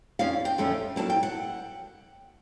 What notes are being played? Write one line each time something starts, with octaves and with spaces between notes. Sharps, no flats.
F2 D3 F3 C#4 F5
G5
F2 D3 F3 A3 C#4
A2 F#3 A#3 A5
G5
F#5